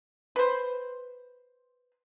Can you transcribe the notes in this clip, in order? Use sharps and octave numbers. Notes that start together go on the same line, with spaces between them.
B4 C5